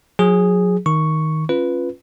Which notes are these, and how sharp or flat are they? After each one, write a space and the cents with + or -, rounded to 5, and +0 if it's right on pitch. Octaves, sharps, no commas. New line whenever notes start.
F#3 -35 G#4 -5
D#3 +10 C#6 +0
C#4 -20 F4 +0 B4 +0